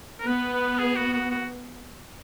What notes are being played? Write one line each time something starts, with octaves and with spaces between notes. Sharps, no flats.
A#4
B3 B4
B4
G#4
F#4
F#4
F#4